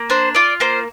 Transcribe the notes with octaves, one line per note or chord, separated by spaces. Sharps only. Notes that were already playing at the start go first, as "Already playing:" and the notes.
Already playing: A#3
D4 C5
F4 D5
A#3 C5